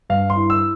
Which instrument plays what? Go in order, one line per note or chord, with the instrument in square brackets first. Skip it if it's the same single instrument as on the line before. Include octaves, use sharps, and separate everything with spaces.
[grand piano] G2 F5
C6
E4
E6